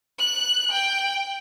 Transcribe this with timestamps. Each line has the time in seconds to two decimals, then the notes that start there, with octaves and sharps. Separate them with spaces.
0.19 F#6
0.71 G5